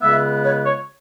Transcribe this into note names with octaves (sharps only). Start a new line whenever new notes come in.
C#2 C#3 G#3 B3 E5
C#5
C#5